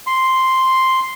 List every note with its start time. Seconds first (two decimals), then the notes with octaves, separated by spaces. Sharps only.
0.07 C6